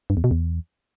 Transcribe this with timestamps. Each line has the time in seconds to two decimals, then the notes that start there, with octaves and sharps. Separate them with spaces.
0.10 G2
0.17 E2
0.24 B2
0.31 E2